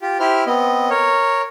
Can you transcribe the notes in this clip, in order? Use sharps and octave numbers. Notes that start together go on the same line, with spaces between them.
F4 G4
E4 G4 C5 F6
B3 C4 D#5
A#4 C#5